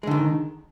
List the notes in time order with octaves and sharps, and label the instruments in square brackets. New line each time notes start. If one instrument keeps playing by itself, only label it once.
[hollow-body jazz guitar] G#3
D3
D#3